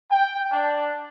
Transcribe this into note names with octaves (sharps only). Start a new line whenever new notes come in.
G5
D4